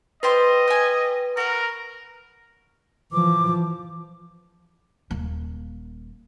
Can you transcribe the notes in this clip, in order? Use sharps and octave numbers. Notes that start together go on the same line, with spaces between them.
F4 G4 B4 C5 D#5
G4 G#5
F#4 A#4 B4
E3 F3 D6
D#1 A#3